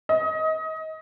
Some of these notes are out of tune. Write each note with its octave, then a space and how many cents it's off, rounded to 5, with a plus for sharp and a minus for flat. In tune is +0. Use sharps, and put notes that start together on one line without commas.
D#5 +25